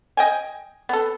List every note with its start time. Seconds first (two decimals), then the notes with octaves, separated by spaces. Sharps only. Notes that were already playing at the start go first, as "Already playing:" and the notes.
0.17 D#5 G5 G#5
0.89 B3 A4